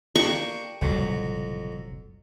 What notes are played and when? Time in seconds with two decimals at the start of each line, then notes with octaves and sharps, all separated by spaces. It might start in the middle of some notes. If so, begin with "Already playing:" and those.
0.16 A#3 D4 G4 C#6
0.81 F#1 C2 F2 A#2 F#3